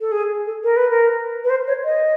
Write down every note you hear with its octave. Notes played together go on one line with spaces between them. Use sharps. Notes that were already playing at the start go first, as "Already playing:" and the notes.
A4
G#4
A4
A#4
B4
A#4
B4
C5
C#5
D#5